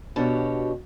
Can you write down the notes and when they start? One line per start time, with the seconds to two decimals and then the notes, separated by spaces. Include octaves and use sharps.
0.16 B2 D4 F#4 G4 C#5